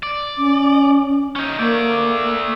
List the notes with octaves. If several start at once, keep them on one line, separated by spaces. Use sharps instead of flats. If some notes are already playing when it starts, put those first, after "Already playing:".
D5
C#4
C#4 D#4
A3 A#3 D5